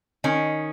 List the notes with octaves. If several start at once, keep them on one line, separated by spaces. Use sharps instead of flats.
D#3 C#4